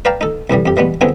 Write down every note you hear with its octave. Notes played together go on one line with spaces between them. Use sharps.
B4 D5 F5 G5 A5 A#5
D#4 A4
C2 A2 E3 G3
F2 G4
E3 G3 G#3 B3
D3 F#3 B3 C4 E4 G#4